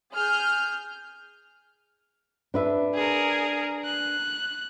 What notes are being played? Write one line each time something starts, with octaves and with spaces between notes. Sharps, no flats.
G#4 F6 G6
D4 B4 E5
G#4 A#4
F#6